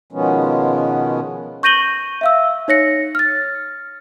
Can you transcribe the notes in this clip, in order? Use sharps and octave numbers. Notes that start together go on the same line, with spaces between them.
B2 D#3 F3 G#3 B3 C#4
C#6 G6 A#6 D#7 F#7 G7
E5 F5 E6
D#4 C#5 A#6 C#7
F6 A6